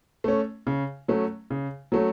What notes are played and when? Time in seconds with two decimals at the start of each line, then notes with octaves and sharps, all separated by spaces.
0.24 A3 C#4
0.67 C#3
1.08 F#3 A3 C#4
1.50 C#3
1.92 F#3 A3 C#4